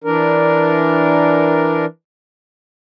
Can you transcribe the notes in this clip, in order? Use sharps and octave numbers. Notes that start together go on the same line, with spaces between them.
E3 D4 A#4